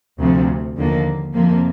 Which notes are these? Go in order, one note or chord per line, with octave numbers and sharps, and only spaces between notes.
D2 C3 F3
D#2 D3 F3 A#3
F2 C3 F3 A#3